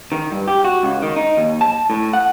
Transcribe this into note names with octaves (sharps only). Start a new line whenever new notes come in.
D#3
G2
G4
F#4
C#2
D#3
D#4
D#2
A5
A2
F#5